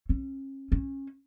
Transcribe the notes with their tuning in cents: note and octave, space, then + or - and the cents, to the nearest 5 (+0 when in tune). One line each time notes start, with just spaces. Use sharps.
C#4 -40
C#4 -25